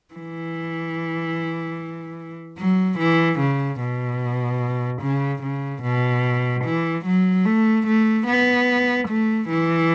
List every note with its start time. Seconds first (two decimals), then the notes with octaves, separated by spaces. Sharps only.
0.14 E3
2.58 F#3
2.99 E3
3.40 C#3
3.81 B2
5.02 C#3
5.43 C#3
5.83 B2
6.65 E3
7.06 F#3
7.46 A3
7.87 A3
8.27 B3
9.09 A3
9.49 E3